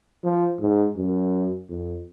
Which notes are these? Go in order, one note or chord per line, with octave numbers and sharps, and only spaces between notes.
F3
G#2
F#2
F2